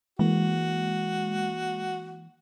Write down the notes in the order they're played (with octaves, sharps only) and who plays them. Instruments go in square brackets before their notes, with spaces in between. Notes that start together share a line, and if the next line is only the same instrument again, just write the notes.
[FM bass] E3 [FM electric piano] G#3 A#3 [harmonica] F#4